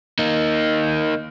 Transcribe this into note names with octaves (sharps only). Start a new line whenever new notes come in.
A#3 D#4